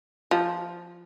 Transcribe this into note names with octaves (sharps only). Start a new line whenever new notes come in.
F3